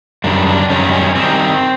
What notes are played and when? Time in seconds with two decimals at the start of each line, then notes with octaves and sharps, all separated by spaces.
0.24 F#2 D#3 G3 D4
0.47 D4
0.70 F#2 D#3 G3 C#4
0.93 C#4
1.15 D#3 G3 C4